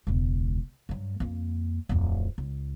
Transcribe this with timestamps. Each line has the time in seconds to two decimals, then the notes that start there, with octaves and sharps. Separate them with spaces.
0.07 E1 C#2
0.89 G2 F#3
1.20 F2 A#3
1.89 D1 F2
2.38 C#2